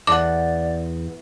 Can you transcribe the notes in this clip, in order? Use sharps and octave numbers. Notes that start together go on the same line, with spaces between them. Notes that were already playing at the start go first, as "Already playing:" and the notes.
E2 D4 D5 F#5 D6